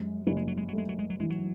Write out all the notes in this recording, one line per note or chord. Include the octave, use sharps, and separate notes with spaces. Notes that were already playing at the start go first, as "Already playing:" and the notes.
Already playing: F#2 G#3
F#1 F#3
G#3
F#3
G#3
F#3
A3
G#3
F#3
G#3
F#3
E3 G#3
F#3